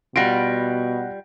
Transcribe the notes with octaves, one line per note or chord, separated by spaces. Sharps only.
B2 G3 F4 F#5 A#6 D7